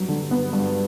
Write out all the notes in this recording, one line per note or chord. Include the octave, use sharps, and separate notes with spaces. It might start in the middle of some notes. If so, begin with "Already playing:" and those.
Already playing: G2 F#3
D3
B3
G2